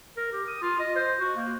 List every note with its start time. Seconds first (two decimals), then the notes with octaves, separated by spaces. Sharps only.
0.17 A#4
0.33 G4
0.48 D#6
0.62 F4
0.79 D#5
0.96 C5
1.20 F#4
1.37 A#3